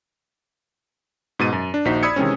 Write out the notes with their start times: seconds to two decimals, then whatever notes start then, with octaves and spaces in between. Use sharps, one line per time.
1.39 G#2 B2 A6 D#7
1.53 F#2
1.74 D4
1.85 A#1 D#2 D#4 F#4 C5 B6
2.03 D5 B5 D#6 E6 G#6 C#7
2.16 C3 D#3 E3 G#3 C4 C#4